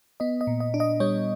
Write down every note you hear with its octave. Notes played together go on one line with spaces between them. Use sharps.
B3 D#5
D#5
A#2
D#5
D4
D#5
G3 C#5